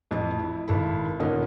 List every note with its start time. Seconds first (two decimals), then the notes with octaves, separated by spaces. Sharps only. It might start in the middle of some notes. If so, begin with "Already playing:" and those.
0.11 A1 F2 D#5 A5
0.39 E4
0.68 G#1 E4 A4 B5
1.19 D#1 A#2 D3 C#4 D#4 A#4